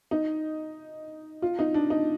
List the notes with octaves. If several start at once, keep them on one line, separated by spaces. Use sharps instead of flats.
D#4
F4
D#4
D4
D#4